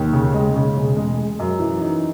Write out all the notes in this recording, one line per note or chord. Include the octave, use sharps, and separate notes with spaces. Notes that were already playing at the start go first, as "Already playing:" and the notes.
Already playing: D#2
C#3
G#3
C#3
E1
G#3
G#3
F#2
E3
D#4